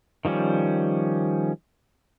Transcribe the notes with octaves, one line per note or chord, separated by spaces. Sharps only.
D#3 F3 G3 C#4